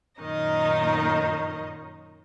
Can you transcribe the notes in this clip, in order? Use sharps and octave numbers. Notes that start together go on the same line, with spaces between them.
F#2 A#2 D#3 D#4 D#5